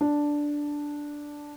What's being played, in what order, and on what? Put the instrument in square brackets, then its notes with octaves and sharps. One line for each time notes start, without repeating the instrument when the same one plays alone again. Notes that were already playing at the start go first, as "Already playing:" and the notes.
[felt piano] D4